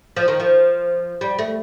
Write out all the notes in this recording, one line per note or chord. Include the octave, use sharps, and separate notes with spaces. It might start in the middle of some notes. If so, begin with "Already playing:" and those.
F3
D#3
F3
G3
A3